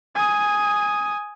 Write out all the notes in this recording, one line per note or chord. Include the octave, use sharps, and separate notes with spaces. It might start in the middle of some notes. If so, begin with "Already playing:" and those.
G#5 D#6